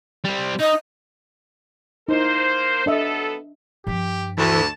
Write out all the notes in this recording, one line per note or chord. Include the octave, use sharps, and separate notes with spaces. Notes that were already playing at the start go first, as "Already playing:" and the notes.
G3 C4
D#4 D#5
A#3 D#4 E4 A#4 C5
F#3 B3 D4 A4 D#5 E5
G2 F3 G4
D2 E3 A5